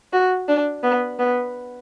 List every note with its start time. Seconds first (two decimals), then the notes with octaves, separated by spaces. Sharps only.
0.13 F#4
0.49 D4
0.83 B3
1.19 B3